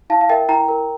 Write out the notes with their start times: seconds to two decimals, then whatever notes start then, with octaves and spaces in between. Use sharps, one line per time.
0.10 E4 F5 A5
0.21 F5
0.29 A#4 E5 G5
0.48 E4 G5 A#5
0.68 A#4